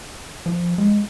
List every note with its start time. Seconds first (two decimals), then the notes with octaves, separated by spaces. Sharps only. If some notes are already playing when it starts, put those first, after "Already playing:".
0.46 F3
0.78 G#3